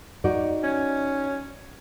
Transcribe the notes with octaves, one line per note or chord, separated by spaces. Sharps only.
D#4 F#4 D5
C#4